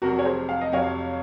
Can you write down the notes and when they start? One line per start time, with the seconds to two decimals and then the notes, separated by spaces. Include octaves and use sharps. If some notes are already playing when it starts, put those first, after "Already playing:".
0.02 F1 F2 C3 F#3 F#4 A#4
0.19 C#5
0.25 G#4 C5
0.49 F5
0.61 D#5
0.72 F1 F2 C3 F#3 C#5 F5